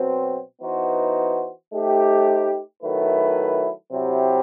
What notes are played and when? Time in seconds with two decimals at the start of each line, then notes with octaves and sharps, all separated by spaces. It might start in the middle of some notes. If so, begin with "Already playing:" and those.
Already playing: B2 F#3 C4
0.61 E3 B3 D#4 F#4 C5
1.72 A3 D#4 G4 C5
2.82 D#3 F#3 A3 E4 B4
3.92 C3 F#3 C4 E4 G4